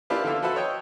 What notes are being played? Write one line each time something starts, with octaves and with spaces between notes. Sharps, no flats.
A#3 D4 E4 F4 G4 B4
D3 F4 E5
F#4 A4 B4 C5 E5
C#5 D#5 G5